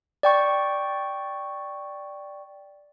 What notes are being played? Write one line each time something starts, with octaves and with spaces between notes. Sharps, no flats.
D5 G5 C#6